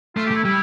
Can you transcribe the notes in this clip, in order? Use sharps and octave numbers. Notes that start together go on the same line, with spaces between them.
A3 F4
G4
A3 E4
G3 E4